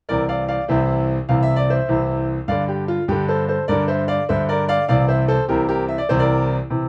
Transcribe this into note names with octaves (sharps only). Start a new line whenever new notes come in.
C2 C3 E3 A#4 D5
D5 F5
D5 F5
C2 C3 E3 C5 E5
C2 C3 E3 F5
E5
D5
C5 E5
C2 C3 E3
G2 D3 D5 F5
G4
F4
G2 D3 G4
A4 C5
A4 C5
G2 D3 A#4 D5
C5 E5
D5 F5
G2 D3 C5 E5
A#4 D5
D5 F5
C2 C3 E3 D5 F5
C5 E5
A4 C5
C2 C3 E3 G4 A#4
G4 A#4
E5
D5
C2 C3 E3 C5
A#4 D5
C3 E3